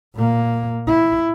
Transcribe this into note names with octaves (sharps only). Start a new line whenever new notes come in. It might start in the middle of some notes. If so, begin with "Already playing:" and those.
A#2 A#3
E4